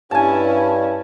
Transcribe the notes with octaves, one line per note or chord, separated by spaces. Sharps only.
G2 C#4 E4 G#5 A5